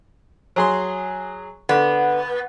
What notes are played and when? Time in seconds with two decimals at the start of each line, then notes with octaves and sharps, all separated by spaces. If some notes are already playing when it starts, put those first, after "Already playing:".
0.56 F#3 G#4 C6
1.69 D3 B3